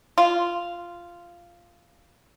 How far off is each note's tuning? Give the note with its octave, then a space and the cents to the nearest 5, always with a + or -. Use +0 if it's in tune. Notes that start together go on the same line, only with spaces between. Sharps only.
F4 -10